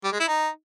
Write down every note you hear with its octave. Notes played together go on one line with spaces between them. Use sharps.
G3
G#3
E4
D#4